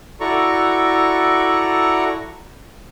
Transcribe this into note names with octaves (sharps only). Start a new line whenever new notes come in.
E4 F#4 A4 D5 A#5 C#6